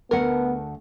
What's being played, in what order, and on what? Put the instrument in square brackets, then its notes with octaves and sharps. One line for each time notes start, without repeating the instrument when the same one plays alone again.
[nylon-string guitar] D2 A3 F#5 [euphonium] B3 [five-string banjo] A#4